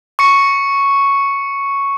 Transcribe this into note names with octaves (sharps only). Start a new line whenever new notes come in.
C#6 C#7